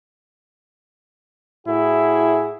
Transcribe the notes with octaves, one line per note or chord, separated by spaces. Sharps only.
A2 E4 F#4 G#4